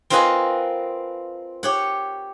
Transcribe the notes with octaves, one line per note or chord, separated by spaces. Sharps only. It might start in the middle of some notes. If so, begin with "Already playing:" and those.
C4 F4 A#4 B4 D#5 G#5
G4 C#5 F#5